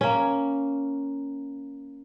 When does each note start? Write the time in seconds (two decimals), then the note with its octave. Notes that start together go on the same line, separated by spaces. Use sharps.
0.01 A#3 C#4